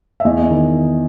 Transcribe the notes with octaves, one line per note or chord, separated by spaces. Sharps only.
E5
E2 D#5
D#5
D#3